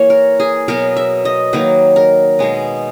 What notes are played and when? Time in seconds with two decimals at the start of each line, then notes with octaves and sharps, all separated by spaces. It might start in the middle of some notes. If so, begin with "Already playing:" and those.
Already playing: E3 A#3 C#5
0.10 A#4
0.40 G#4
0.68 B2 F#3 B3 A#4
0.96 E5
1.25 D#5
1.53 D#3 F#3 A#3 B4
1.96 A#4
2.39 B2 G#3 B3